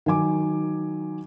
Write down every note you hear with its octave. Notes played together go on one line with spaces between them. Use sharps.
D#3 F#3 G#5 D6